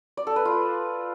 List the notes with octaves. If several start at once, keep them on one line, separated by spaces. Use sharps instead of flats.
D5
A4
B4
F4